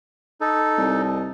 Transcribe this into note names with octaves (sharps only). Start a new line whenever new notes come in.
D#4 A4
C2